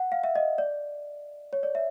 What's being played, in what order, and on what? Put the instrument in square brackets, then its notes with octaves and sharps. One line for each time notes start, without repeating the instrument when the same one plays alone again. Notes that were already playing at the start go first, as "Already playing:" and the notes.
Already playing: [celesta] F#5
F5
E5
D#5
D5
C#5
D5
E5